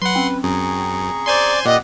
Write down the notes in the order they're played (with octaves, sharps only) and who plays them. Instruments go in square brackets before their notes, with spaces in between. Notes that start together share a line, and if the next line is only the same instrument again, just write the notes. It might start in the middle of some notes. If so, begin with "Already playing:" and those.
[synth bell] F#3 [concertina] B4 [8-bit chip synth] F#5 C6
[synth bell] C4 C#4 G5
[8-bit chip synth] F#2 [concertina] G#4 A#5 C#6
[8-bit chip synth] C5 G#5 C6 [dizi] D5
[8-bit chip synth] A#2 [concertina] G4 D5 F#5 [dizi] D#5